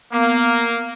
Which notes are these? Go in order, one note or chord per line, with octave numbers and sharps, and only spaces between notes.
A#3 B3